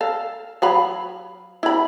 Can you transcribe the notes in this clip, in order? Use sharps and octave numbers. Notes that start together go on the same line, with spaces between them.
A4 F5
F#3 F5 B5
E4 B5